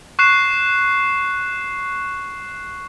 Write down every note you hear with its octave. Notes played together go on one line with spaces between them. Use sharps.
C#6 F#6 C7 E7